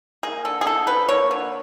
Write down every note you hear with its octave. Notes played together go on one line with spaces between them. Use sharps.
A#3 G#4
D3 A4
G#4
D3 A4
F3 B4
A#3 C#5
D3